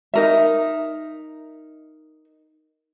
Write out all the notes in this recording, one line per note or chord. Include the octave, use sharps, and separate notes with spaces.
D#4 A#4 E5